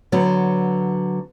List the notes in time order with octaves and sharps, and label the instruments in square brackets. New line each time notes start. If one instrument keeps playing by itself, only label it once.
[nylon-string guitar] D3 F#3 B3